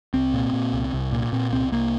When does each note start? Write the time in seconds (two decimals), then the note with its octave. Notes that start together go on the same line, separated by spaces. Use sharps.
0.14 C2 C4
0.34 A#2
0.53 A#2
0.73 C2
0.93 C2
1.12 A#2
1.33 A#2 C4
1.52 C2 C4
1.72 C2 A#3